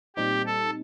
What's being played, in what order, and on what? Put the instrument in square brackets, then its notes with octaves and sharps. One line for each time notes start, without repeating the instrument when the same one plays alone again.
[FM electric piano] A#2 G3 C4 D#4 [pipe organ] G4
[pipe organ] A4